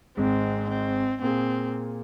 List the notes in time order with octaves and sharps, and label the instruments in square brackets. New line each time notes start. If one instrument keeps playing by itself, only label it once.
[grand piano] G#1 G#2 G#3 [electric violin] C4
[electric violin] C4
[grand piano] A#2 A#3 G#4 [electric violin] C4